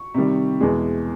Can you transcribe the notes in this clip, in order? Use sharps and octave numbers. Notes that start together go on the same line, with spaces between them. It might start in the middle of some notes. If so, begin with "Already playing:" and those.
Already playing: C#6
C3 D#3 G3
E2 B2 G#3